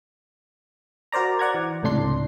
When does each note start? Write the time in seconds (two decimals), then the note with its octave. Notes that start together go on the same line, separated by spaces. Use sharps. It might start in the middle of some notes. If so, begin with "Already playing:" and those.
1.12 F#4 A#4 C5 D5 A#5
1.39 D5 F#5 A#5 G#6
1.54 E3
1.83 C#2 A2 C3 D4 C6 C7